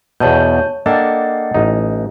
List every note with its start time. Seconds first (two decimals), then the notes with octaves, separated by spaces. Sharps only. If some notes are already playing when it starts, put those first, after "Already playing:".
0.20 E2 B2 C#5 A5 G6
0.86 A#3 D4 A4 D#5 F#5 G5
1.54 A1 D#4